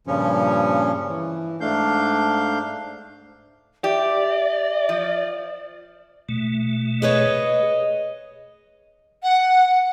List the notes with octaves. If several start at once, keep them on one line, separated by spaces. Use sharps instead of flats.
G2 A#2 C#3 F3 C#4
E3
G#2 A3 D4 F5 G6
G4 D5 E5
F3
B2 A3
G#4 B4 C#5 D#5
F#5